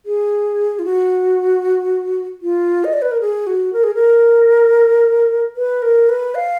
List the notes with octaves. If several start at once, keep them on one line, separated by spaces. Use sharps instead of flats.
G#4
F4
F#4
F4
D#5
D5
B4
A#4
G#4
F#4
A#4
G#4
A#4
B4
A#4
B4
F5